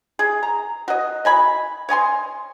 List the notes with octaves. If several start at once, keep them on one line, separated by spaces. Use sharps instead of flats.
G#4
A#5
F#4 D#5
D#5 G#5 B5
C#5 D#5 G#5 C6